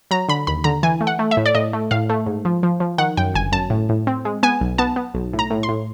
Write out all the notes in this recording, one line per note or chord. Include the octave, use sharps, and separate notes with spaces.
F#3 A#5
D3 B5
D#2 B5
D3 A#5
E3 G#5
A3
F#5
A3
E5
A2
D5
A2 D#5
A3
A2 F5
A3
G#2
F3
F3
F3
D#3 F#5
F#2 G5
G1 G#5
F#2 A5
A2
A2
C4
G#3
B3 G#5
B1
B3 A5
B3
B1
A2
A#5
A2
C6
A2